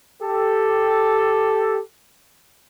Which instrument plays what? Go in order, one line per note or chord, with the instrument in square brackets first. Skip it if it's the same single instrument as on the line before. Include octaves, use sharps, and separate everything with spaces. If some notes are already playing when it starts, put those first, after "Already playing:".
[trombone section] G4 A4